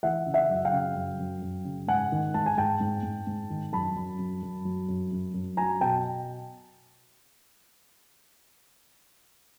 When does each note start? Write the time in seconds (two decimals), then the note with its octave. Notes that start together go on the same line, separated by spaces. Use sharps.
0.03 E3 E5 F#5
0.26 C#3
0.34 E5 F#5
0.50 F#2
0.65 F5 G5
0.73 C#3
0.95 F#2
1.19 F#2
1.42 F#2
1.65 C#3
1.88 G#2 F#5 G#5
2.12 D#3
2.34 G#2 A5
2.46 G#5
2.57 G#2 G5 A5
2.80 G#2
3.03 G#2
3.27 G#2
3.50 D#3
3.73 F#2 A5 B5
3.96 F#2
4.19 F#2
4.43 F#2
4.65 F#3
4.88 F#2
5.12 F#2
5.34 F#2
5.57 F#3 G#5 A#5
5.81 B2 G5 A5